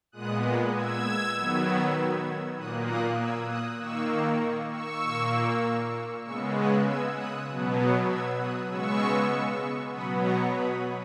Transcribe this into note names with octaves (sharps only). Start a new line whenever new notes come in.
A#2 G#3 B3 D#6 F#6
E6 G#6
D#3 F#3 B3
A#2 A#3 D#6 F#6
D#6 F#6
E6 G#6
D#6 F#6
D#3 A#3 C#6 E6
C#6 E6
A#2 A#3
C#3 G#3 B3 C#6 E6
D#6 F#6
E6 G#6
D#6 F#6
B2 F#3 B3
E6 G#6
D#6 F#6
C#3 G#3 B3 C#6 E6
B2 F#3 B3 B5 D#6
A#5 C#6
B5 D#6